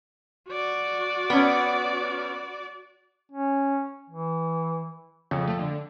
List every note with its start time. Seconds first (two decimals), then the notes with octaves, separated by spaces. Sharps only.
0.49 F#4 D5
1.30 B3 C#4
3.32 C#4
4.10 E3
5.31 F2 C#3
5.48 A3
5.59 D3